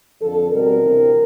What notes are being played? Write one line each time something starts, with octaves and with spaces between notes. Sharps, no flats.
F2 D3 F3 A4
B2 G3 C4 D#4 A#4
D2 C3 E3